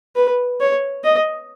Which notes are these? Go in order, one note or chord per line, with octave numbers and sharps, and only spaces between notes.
B4
C#5
D#5